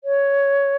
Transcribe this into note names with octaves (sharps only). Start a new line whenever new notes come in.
C#5